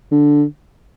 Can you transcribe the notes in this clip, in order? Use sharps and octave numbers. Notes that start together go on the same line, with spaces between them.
D3